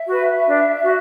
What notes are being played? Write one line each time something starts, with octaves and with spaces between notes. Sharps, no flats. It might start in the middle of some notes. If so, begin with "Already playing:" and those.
Already playing: E5
F#4 B4
D4
F#4